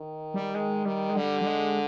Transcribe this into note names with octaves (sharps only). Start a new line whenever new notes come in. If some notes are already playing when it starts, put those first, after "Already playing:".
Already playing: D#3
G3
D#3 G#3
D#3 G3
G#3
D3 G3
G3
G#3